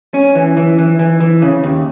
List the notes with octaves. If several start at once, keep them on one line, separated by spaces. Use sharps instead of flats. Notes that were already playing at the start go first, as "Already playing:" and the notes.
C#4
E3
E3
E3
E3
E3
C#3
D#2